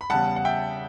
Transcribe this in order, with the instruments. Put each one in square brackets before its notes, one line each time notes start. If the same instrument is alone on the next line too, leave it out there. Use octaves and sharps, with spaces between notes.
[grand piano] B5
E2 C#3 G3 F#5 A5
F#5
E5 G5